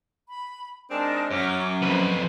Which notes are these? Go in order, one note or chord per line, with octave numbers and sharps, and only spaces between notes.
B5
G#3 C4 D4 D#4 A#4 A5
F#2 F#3 C#4 D6 F6
F2 B4 C5